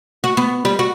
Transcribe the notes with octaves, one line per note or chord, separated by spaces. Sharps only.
F#4
B3
G3
F#4